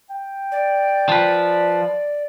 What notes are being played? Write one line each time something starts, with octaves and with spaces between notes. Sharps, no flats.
G5
D5
F3 B4